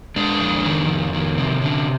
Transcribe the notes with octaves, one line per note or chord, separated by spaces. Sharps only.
G#3 D4
F2
D#3
F2
D#3
C3
D3